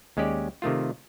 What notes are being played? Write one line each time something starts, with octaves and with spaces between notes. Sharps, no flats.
D#2 G#3 C#4 G4 D5
C3 D#3 A3 F4